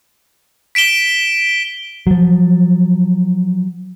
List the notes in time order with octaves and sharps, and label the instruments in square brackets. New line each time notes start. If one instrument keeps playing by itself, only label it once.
[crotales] B6 D7 E7 G7
[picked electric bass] F3 F#3